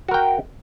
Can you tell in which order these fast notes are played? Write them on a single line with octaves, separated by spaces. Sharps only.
F#4 A#4 G5